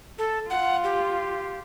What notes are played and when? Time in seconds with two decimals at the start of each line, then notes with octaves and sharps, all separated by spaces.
0.18 A4
0.50 F4 F#5
0.84 G4